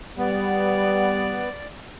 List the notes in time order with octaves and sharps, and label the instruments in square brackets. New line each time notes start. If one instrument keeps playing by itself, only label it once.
[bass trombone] G3 [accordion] B3 [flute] D5